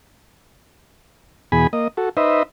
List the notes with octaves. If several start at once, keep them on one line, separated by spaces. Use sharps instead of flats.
E2 B2 G#4 G#5 B5
A#3 D#5
F#4 A4
D#4 B4 C5 D#5 E5